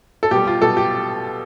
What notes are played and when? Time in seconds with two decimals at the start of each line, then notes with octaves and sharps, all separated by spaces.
0.23 A4
0.31 B2 G3 G4
0.47 F4
0.62 B2 G3 A4
0.77 G4